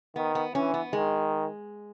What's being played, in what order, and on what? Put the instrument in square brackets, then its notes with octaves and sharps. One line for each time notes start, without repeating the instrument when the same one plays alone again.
[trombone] D#3 [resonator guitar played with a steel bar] B3
[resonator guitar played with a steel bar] B3
[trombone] E3 [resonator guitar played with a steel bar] C#4
[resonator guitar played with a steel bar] B3
[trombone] D#3 [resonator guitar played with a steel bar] G#3